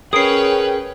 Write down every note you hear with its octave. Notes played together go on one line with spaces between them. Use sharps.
C#4 G#4 A#4 B4 C#5 G5 D#6 C7